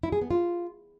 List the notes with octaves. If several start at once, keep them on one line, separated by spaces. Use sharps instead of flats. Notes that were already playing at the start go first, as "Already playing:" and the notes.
E4
G#4
B3
F4